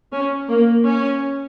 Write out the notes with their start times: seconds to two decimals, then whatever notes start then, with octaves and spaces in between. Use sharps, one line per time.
0.12 C#4
0.49 A#3
0.84 C#4